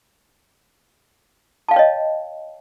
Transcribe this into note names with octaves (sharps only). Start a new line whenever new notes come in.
C#5 D#5 F5 G5 A5